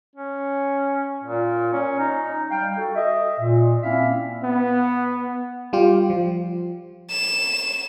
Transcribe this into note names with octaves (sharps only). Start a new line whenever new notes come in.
C#4
A#2
C#4
D#4
G3 F5 G5
F#4 A4
D#5 E5
A#2
A#3 C4 C#4 E4 E5 F5
B3
G3 F4 G4
F3
E7